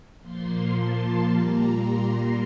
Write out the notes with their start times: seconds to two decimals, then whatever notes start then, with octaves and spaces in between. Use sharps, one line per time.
0.21 A#2 F3 A#3 C6
0.74 A5
1.26 A#2 G3 A#3 A#5
1.80 C6